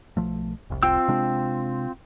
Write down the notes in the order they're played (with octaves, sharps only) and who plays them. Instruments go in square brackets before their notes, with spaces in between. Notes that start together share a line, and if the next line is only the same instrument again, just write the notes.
[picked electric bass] B1 F3 A3
F1 C2
[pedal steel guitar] C4 F4 E6 [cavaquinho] G5
[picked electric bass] C3 G#3 D4